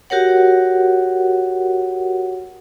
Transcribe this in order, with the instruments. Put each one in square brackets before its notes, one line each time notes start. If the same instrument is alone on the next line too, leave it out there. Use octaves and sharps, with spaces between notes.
[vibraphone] F#4 G4 A#4 C#5 F#5